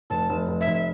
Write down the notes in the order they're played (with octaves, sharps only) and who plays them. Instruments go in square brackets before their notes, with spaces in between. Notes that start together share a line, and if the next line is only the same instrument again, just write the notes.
[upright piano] F1 [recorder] A5
[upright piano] F1
F1
[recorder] E5
[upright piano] F1